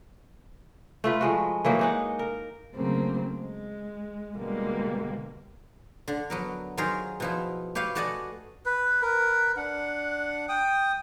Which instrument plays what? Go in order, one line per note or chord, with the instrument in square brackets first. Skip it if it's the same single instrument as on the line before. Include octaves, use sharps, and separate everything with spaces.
[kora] A3 F4 B4
F3 G#3 F#4
E3 F#3 A#3 D#4
G#3 D#4 F#5
A#4
[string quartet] C#3 F#3 A3 A#3 C4
G#3
B2 D3 G3 G#3 A#3
[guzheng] D3
F#3 B3 A#4
D#3 F#3 F4 G#4 A#4 C5
B2 F3 E4
G4 B4 C#5 F5
A3 F#4 D5 D#5 F#5 G#5
[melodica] B4
A#4 B4
D4 F#5
G5 D#6